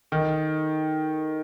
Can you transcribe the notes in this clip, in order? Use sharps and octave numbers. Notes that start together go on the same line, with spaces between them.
D#3 D#4 A4 D#5